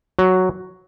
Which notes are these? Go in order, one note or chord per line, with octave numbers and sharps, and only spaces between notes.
F#3